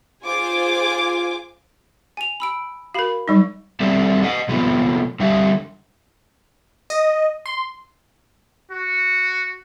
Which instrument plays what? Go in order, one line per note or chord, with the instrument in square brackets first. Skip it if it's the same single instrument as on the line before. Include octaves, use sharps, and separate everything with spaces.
[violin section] F4 G#4 C5 G#5 D6
[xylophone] G#5 F7
B5 E6 D7
[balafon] F#4 A#4 [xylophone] F5 B5
[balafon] F#3 G3 D#4
[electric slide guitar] G3 C4 D4 A4 E5
D#5 F#5
C3 F3 A3 B3
D3 G3 E5
[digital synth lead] D#5
C6
[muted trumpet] F#4